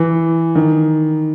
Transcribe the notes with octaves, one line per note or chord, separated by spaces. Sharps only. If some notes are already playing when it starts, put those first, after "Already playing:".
Already playing: E3
D#3